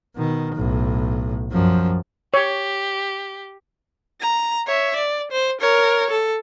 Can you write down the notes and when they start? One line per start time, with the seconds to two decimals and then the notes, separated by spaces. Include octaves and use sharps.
0.15 B2 D#3
0.55 B1 A2
1.51 F#2 F3
2.34 G4 C#5
4.21 A#5
4.67 C#5 E5
4.96 D5
5.32 C5
5.61 A#4 C#5
6.10 A4